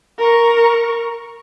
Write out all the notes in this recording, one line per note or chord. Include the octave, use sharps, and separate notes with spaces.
A#4 C#6